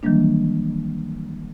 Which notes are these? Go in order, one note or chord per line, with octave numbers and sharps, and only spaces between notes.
D#3 E3 F#3 G3 A#3 D4